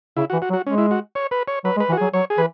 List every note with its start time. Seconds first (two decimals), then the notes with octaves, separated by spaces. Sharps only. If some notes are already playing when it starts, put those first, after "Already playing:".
0.17 C#3 E4
0.30 E3 F#4
0.42 F#4
0.50 F#3
0.53 F#4
0.66 G#3 C#4
0.78 E4
0.91 F#4
1.15 C#5
1.31 B4
1.48 C#5
1.64 F#3 B4
1.77 G#3
1.80 B4
1.89 E3
1.92 F#4
1.97 F#3 G#4
2.13 F#3 C#5
2.30 G#4
2.38 E3 B4